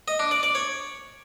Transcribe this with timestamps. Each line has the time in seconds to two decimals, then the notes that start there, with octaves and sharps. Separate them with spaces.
0.08 D#5
0.19 D4
0.31 D5
0.43 D5
0.55 C#5